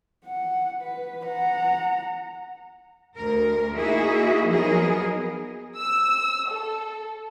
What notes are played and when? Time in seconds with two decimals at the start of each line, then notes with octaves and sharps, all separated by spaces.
0.25 F#5
0.81 B4
1.26 F#5 A#5
3.15 D2 A#4
3.75 A#3 D#4 E4 F#4 G#4 E5
4.47 F3 F#3 B3 D#4 G#4 A#4
5.76 E6
6.50 A4